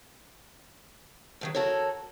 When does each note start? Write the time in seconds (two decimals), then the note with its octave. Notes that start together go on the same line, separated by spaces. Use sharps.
1.41 A2 D#3 F#3
1.55 F#4 A4 A#4 C#5